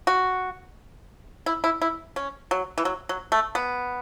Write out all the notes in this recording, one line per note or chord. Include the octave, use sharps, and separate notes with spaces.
F#4
E4
E4
E4
C#4
F#3
E3
F#3
F#3
A3
B3